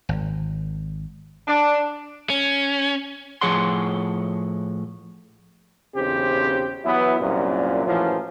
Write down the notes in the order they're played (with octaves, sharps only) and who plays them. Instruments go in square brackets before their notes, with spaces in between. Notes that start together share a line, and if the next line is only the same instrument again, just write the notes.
[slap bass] G#1
[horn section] D4
[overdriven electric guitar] C#4
[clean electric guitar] A2 F3 G#4 C#5 F#5 C6
[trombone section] B1 E2 C#3 C4 G4 C5
E3 F#3 B3 E4
C2 F#2 A#2
F#2 A2 E3 F3